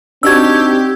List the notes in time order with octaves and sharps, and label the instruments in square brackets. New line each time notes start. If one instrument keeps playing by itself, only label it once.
[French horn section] C4 [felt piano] D4 D#4 F#4 [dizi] G4 [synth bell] E6 G#6